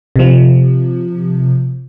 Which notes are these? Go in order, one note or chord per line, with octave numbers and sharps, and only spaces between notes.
C3 F3